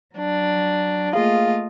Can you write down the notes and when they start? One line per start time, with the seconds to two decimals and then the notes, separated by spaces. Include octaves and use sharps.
0.15 F#3 D4
1.13 A3 A#3 F4 G#4 D#5 F5